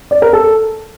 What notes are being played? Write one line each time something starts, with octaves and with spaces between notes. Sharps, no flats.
D5
A#4
A4